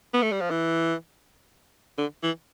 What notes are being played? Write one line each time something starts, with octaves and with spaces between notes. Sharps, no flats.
B3
A3
G3
F3
E3
D3
E3